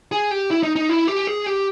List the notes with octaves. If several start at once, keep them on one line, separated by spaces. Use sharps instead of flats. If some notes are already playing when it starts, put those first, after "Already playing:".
G#4
G4
E4
D#4
D#4
E4
G4
G#4
G4